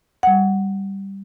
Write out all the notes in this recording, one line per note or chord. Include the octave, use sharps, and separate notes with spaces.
G3 F#5